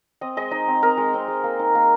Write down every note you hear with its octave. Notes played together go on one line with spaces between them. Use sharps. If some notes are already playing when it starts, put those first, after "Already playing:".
C4 D#5
G#3 D#5
D#4 D#5
C4
C4 A#4
G#3
C4
G#3
A#3
D#4
A#3